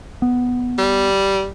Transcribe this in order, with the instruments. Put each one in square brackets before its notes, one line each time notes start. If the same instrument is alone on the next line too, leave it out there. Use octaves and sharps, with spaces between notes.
[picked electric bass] B3
[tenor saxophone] G3